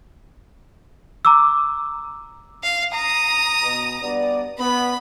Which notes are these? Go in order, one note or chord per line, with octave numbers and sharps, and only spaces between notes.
A#5 D6 E6
F5
A#5 D#6
B2
G2 B3 D5
B3 B5